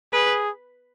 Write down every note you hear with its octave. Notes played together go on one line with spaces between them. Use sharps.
G#4 B4